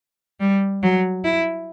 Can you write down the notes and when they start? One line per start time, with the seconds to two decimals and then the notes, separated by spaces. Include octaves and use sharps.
0.40 G3
0.83 F#3
1.24 E4